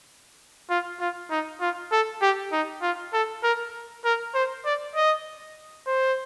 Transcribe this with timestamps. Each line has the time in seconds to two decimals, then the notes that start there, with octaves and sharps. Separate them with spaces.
0.70 F4
1.00 F4
1.30 D#4
1.61 F4
1.92 A4
2.22 G4
2.52 D#4
2.82 F4
3.13 A4
3.43 A#4
4.05 A#4
4.34 C5
4.65 D5
4.95 D#5
5.87 C5